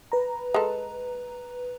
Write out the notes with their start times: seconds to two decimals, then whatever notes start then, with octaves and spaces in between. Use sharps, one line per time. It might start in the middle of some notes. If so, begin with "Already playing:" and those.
0.12 B4 A#5
0.54 G#3 A4